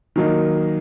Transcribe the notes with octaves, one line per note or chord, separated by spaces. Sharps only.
D#3 F#3 A#3 D#4